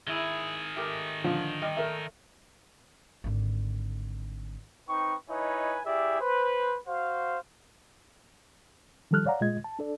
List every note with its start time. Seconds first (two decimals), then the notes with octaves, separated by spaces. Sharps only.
0.07 D#3 G#3 E4 G#4
0.76 A3 G4 A#4
1.24 D3 F3
1.62 G3 D#5
1.77 A3 A#4 E5
3.24 G#1 D3
4.89 C4 D#4 B4 G5 C#6
5.30 D#4 E4 B4 C#5 D#5 G#5
5.86 E4 G4 G#4 D5 E5
6.21 B4 C5
6.87 F#4 C5 F5
9.11 D#3 F3 G3 A4 F6 F#6
9.26 C#5 D5 F5 F#5 A#5
9.41 A#2 G#3 F4 D#5 G#6
9.64 A5
9.79 D4 A4 D5